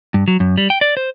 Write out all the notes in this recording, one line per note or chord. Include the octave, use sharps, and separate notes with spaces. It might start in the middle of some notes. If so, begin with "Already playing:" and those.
G2
F#3
F#2
G3
G5
D5
C5